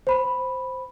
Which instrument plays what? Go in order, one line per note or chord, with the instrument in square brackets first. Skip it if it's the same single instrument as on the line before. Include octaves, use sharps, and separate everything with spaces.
[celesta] C5 B5